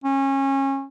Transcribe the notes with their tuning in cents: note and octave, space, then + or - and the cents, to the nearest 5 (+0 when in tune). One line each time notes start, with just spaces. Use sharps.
C#4 -25